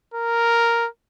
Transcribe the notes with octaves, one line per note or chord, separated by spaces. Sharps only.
A#4